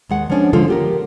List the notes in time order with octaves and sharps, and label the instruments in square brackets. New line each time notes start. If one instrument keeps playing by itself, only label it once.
[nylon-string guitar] D#2 G#3 F#5
F3 G#3 B3 C#4 D4
D3 F3 G#3 C#4 F4 A4
B3 G4 A#4